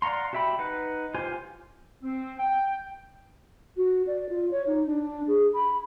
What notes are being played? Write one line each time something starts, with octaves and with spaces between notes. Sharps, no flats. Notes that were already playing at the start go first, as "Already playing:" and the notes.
D5 F5 F#5 A#5 C6
F#4 G4 E5 G5 B5
D#4 B4 F#5
F4 G4 C5 F5 G#5
C4
G5
F#4
D5
F4
C#5
D#4
D4
G#4
B5